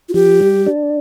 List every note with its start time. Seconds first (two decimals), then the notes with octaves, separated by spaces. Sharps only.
0.09 F4
0.14 F3 G4
0.40 G3
0.66 D4